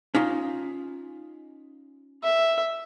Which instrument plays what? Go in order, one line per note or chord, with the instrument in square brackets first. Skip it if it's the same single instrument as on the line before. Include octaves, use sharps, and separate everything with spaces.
[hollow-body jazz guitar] C#4 D#4 F4
[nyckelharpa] E5